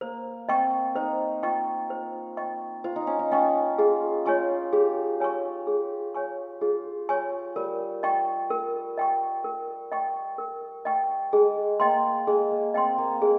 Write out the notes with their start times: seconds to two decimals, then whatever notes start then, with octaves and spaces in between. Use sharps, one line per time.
0.01 A#3 C5
0.49 C4 D#5 G5 C#6
0.95 D#4 C5
1.43 F4 D#5 G5 C#6
1.90 C5
2.37 D#5 G5 C#6
2.84 F4 C5
2.96 D#4
3.07 C#4
3.19 D#4
3.31 C#4 D#5 G5 C#6
3.78 F4 G#4
4.26 F4 C#5 G#5 C#6
4.73 G4 G#4
5.20 C#5 G#5 C#6
5.67 G#4
6.14 C#5 G#5 C#6
6.61 F4 G#4
7.09 C#5 G#5 C#6
7.56 G3 A#4
8.03 D#5 G5 C#6
8.50 A#4
8.98 D#5 G5 C#6
9.44 A#4
9.92 D#5 G5 C#6
10.38 A#4
10.85 D#5 G5 C#6
11.33 G#3 G#4
11.80 A#3 D#5 G5 C6
12.27 G#3 G#4
12.51 A#3
12.74 C4 D#5 G5 C6
12.98 A#3
13.21 G#3 G#4